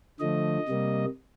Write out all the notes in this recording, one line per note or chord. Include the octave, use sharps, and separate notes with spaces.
D3 F3 A3 D#5
C3 G3 A#3